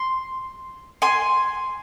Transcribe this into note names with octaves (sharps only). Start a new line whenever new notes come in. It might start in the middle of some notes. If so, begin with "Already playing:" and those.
Already playing: C6
G#5 C6